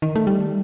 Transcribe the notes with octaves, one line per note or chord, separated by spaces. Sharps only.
D#3
A3
G3